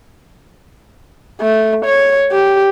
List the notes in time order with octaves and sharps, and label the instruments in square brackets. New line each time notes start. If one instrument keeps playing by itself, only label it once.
[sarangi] A3
C#5
G4